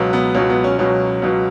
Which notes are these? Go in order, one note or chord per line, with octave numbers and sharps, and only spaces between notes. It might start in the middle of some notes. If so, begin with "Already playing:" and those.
Already playing: C#2 B2 F#3
B3
C#2 B2 F#3 C#4
B3
C#4
C#2 B2 F#3 C#4
C#2 B2 F#3